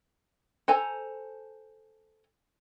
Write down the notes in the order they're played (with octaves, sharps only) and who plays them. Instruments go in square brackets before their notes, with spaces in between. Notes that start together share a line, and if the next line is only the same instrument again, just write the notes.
[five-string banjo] A4 C5 G#5 A#5